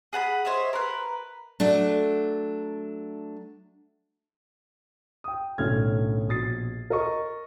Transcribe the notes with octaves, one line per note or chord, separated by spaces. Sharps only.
G#4 F#5 A5 B5
C5 C#5 D#5 E5
A#4 B4
F#3 A3 D4
G5 D#6
B1 A2 D3 C#4 F6 G#6
A#1 B2 D#6 A6 C7
A#4 D#5 C#6